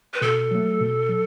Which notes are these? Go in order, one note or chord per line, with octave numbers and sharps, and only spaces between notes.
B4
B2 A4
F#3 A3
B2
F#3